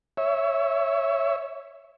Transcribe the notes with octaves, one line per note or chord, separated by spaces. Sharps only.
C#5 E5